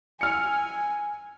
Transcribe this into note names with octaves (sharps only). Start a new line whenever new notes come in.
G#5 E6 F6 C#7